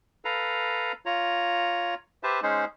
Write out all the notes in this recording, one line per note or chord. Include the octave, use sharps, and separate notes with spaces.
A4 B4 F5 A#5
F4 C#5 A#5
G4 B4 C5 E5 A5
G#3 C#4 D#4 G#4 C5